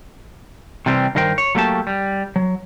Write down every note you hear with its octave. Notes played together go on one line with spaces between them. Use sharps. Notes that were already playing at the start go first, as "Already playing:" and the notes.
C3 E3 G3 C4
G2 D#3 A#4 C5 G5
C#5
F#3 A3 A#3 G4 A5
G3
F#3